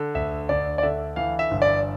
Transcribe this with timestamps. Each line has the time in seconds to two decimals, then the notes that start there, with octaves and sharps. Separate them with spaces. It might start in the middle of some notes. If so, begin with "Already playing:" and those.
Already playing: D3
0.15 D2 E5
0.49 D2 D5
0.78 D5
0.83 D3 E5
1.16 E3 F5
1.39 E5
1.51 G1
1.62 D5